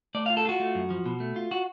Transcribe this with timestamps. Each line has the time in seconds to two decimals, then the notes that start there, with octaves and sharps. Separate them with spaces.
0.15 A3 D5
0.26 F4 F5
0.37 A4
0.45 F4 F#4
0.60 A3
0.75 F#2
0.90 F3
1.06 B2
1.20 A3
1.36 F4
1.51 F#4